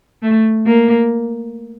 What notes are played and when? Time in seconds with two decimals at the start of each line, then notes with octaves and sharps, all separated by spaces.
0.22 A3
0.66 A#3